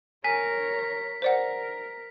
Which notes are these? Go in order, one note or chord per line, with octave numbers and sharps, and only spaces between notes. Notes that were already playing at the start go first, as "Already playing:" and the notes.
A#4 C#5 G#5 B6
A#4 C5 D5 F#5